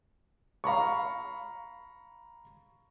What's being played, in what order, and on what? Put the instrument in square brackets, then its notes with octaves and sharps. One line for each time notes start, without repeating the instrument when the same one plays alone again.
[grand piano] F5 A#5 B5 C#6